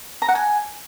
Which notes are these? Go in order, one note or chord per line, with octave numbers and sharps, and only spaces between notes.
A#5
F#5
G#5